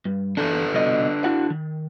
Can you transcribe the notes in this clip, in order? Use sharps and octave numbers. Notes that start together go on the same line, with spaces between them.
G2
E2 D3 D4 A4 B4
C2 B2 D#5
E4 F#4 F#5
D#3